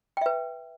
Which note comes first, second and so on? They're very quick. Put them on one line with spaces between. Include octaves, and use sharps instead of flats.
G5 E5 B4